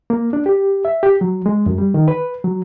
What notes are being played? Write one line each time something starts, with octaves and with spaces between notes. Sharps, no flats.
A#3
D4
G4
E5
G4
F#3
G#3
F#2
G3
D#3
B4
F#3